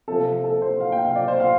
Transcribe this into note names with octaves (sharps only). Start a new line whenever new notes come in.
C3 F3 A4
A4
C5
F5
G5
F5
D5
C5
F5